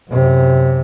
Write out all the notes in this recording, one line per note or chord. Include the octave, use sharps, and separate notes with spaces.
F#2 C3